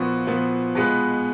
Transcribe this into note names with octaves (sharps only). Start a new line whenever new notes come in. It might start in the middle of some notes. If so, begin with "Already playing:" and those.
Already playing: A#2 F3 B3 F#4
A#2 F3 B3 F#4
B2 G#3 B3 F4 B4